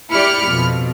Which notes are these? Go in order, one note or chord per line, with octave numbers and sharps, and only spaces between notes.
E4 G4 D5 B5 F6 C#7
F2 B2